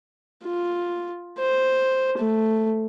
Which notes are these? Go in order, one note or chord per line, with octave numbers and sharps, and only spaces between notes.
F4
C5
A3